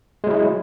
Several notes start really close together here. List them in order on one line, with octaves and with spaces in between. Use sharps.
G#3 F#3 E4